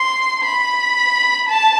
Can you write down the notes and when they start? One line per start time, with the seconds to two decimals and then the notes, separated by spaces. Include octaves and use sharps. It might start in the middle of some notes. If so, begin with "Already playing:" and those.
Already playing: C6
0.44 B5
1.49 A5